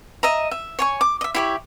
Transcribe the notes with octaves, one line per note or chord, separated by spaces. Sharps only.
D#5 E5 A#5
E5
C#5 G#5 C#6
D6
D#5 E5
E4 G4 C#5